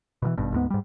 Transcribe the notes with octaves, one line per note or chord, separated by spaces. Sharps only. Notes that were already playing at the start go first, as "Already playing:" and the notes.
B2 D3 E3
G#1 G2 B2
D2 G#2 B3
G#2 G3